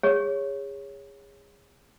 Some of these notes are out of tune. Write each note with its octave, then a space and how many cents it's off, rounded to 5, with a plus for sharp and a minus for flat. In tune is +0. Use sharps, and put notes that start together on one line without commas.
G#4 -30 C#5 +0 C#6 -15